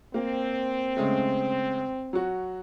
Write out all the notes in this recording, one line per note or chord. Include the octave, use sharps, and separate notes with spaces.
A#3 C4
C#3 G#3 A3
F#3 F#4